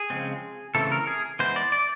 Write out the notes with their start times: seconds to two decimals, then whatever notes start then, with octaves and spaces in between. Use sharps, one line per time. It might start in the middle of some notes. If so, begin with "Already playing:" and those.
Already playing: G#4
0.10 C#3 F3 G#3 C4
0.75 C#3 E3 A3 C4 A4
0.92 A#4
1.07 G#4
1.39 E3 G#3 B3 C5
1.56 D5
1.72 D5